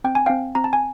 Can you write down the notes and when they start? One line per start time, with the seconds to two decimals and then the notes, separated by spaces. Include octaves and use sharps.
0.04 C4 G5
0.15 G#5
0.26 C4 F5 G5
0.55 C4 A#5
0.64 A5
0.73 G#5